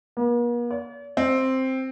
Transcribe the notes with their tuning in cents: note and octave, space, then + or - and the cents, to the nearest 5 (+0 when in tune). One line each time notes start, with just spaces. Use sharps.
A#3 +45
D5 -45
C4 +5